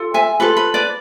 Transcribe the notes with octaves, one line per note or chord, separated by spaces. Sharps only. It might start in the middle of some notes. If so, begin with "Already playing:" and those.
Already playing: F4 A4
E5 G#5
F4 A4 B4
B4
B4 D5